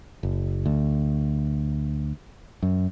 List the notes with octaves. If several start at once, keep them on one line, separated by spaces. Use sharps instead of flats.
F#1
D2
F#2